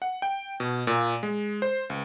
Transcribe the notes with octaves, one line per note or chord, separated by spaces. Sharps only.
F#5
G5
B2
A#2
G#3
C5
C#2